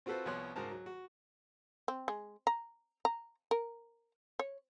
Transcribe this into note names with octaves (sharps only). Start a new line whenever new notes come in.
C4 F4 F#4 A4 B4 C5
C2 F3 B3 C#5 C6 F#6
C#2 G#2 F#4 A#4 C5 A5
F#3
F#4
C4
G#3
A#5
A#5
A#4
C#5